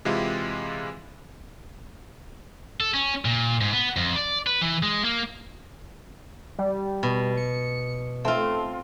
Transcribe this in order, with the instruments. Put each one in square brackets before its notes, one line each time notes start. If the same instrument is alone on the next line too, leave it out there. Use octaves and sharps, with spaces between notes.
[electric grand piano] C3 E3 G#3 E4 F4 G4
[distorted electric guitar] A4
C#4
A#2
G#2
B3
F2
D5
B4
E3
G#3
A#3
[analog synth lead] G3
[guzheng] B2
[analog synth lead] C#7
[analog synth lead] A3 [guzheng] C4 F4